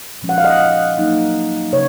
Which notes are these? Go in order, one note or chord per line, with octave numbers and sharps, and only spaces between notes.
A#2 F3 G#3 C#4
F#5
F5
D#5 F#5
F#3 A#3 D#4
C#3 C#5